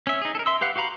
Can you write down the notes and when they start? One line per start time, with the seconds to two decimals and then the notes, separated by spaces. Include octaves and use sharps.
0.07 C#4 E5
0.22 D#4 G#4
0.35 A4 A#4
0.46 E5 C6 E6
0.61 G4 B4 F5 F#5
0.76 F#4 G4 F5 A#5 B5